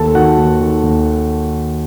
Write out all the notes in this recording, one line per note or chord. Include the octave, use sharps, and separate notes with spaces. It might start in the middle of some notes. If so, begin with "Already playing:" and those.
Already playing: D#2 A4 A5
D#3 F#4 F#5
D#2
D#3
D#2